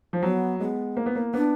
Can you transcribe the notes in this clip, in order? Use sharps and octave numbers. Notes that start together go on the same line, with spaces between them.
F3
F#3 B3
G#3 B3
A#3
B3
A#3
B3 D4